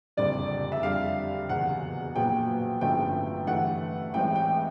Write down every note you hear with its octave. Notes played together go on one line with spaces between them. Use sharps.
F#1 F2 D3 G3 D5
E5
F2 D3 G3 F5
F#1 E2 B2 F#5
A#1 A#2 F#3 B3 G5
G1 F#2 D3 F3 A3 G5
G2 E3 A3 F#5
A1 A2 E3 G#3 C4 G5
G5